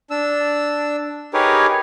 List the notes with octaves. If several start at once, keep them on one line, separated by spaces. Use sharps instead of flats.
D4 E6
D#4 G4 G#4 A#4 B4 C#5